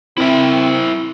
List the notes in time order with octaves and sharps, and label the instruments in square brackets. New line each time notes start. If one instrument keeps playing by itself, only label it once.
[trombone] C4 [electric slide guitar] E4 A#4 E5